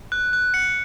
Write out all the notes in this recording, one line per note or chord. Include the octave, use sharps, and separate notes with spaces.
F#6
F#6
C#7